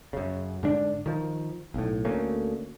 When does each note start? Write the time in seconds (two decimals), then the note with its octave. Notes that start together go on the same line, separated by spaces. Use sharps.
0.13 F#2 C#3
0.63 G#2 D3 D4
1.06 D#3 F3
1.74 B1 A2
2.05 D2 A3 A#3 C#4